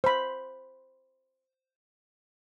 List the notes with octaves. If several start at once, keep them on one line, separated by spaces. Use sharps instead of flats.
C5 B5